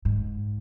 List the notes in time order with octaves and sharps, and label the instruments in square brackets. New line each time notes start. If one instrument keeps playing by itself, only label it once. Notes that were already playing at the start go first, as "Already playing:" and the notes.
[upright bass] G#2